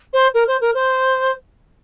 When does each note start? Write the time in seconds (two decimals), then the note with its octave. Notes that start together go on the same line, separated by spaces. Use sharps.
0.13 C5
0.34 A#4
0.48 C5
0.61 A#4
0.74 C5